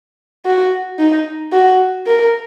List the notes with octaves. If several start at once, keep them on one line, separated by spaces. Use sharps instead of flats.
F#4
D#4
F#4
A#4